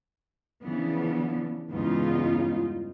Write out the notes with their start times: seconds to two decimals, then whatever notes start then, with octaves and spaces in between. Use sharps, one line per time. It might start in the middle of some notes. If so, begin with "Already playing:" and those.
0.64 C#3 E3 F3 B3 D4
1.73 E2 G2 C#3 G#3 D#4 F4